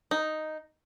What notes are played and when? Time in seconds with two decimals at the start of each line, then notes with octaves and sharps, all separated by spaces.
0.11 D#4